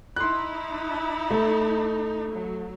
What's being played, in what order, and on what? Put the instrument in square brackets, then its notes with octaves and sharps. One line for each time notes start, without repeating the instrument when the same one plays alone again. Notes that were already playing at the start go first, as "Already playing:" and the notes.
[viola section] D#4 E4 B5 [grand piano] C6 F#6
[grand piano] A3
[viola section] F#3